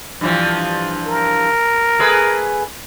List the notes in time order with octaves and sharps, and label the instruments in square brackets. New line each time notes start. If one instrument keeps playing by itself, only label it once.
[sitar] G2 E3 F3
[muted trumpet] A#4
[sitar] A3 G#4 B4